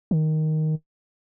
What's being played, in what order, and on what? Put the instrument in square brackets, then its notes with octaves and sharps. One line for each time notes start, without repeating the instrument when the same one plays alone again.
[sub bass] D#3